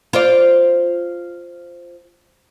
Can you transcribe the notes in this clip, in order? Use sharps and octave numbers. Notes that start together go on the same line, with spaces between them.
F4 C5 D5